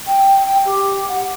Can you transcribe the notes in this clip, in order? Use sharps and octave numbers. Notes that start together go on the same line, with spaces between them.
G5
G5
G4
F#5